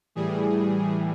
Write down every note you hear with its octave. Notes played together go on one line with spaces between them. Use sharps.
A2 E3 G3 G#4